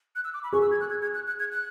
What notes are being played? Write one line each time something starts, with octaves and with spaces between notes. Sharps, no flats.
F#6
E6
D6
B5
G#4 C#6
E6
G#6
F#6
G#6
G#6
F#6
F#6
G#6
F#6